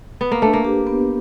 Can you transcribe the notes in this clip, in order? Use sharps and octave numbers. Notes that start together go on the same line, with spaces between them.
B3 B4
A#3
A3 D4
A#3
G4
B3